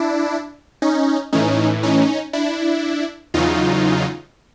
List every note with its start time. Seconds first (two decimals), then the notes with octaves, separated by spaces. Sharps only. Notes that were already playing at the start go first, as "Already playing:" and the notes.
Already playing: D4 E4
0.82 C#4 D#4
1.33 A2 E3 C#4 D#4
1.83 C#4 D#4
2.33 D4 E4
3.34 E2 C#3 F#3 D#4 F4